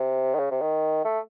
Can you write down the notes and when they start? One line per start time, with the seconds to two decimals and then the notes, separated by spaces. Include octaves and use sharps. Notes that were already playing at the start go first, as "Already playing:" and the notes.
Already playing: C3
0.34 D#3
0.39 C#3
0.51 C3
0.61 D#3
1.05 A3